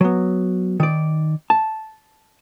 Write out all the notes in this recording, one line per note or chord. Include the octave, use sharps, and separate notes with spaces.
F#3 B3
D#3 D5
A5